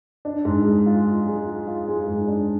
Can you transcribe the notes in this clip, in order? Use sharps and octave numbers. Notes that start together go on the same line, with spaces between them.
D4
G#2
G#3
F4
F4
G#3
F4
F4
G#3
G#2
D4